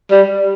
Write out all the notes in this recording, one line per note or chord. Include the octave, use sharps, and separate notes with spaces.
G3